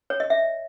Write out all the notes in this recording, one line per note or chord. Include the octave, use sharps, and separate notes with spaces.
C#5
D#5
E5